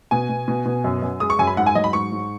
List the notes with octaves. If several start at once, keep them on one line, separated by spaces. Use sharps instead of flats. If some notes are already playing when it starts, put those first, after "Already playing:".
B2 G#5
B2
B2
B2
F#2
F#2
G#3 D#6
C#6
F#2 G#5
B5
G#2 F#5
G#5
F#3 D#5
B5
G#2 C#6
G#2